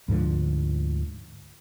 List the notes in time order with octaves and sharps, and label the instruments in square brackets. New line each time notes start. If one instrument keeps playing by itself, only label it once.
[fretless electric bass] D2 G#2 D3 F3